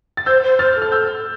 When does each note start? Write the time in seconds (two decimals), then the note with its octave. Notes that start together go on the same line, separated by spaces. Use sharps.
0.17 A6
0.26 C5 E6 G6
0.43 C5
0.59 C5 F6 A6
0.75 A4
0.82 F6
0.92 E6 G6